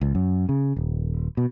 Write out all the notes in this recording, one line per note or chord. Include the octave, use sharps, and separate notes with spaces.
C#2
F#2
C#3
D#1
B2